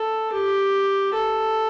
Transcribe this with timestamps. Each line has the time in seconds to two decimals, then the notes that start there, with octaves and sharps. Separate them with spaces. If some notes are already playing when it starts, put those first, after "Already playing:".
Already playing: A4
0.32 G4
1.14 A4